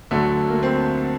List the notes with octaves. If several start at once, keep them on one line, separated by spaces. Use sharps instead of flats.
D2 D3 F#3 A3
A#3
C4